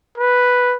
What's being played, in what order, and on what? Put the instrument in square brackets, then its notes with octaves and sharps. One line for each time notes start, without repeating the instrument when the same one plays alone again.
[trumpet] B4